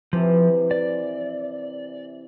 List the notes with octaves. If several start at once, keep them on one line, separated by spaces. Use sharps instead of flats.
C3 E3 F3
D5